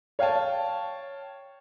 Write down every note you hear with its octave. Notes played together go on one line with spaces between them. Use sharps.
C#5 F5 G5 A5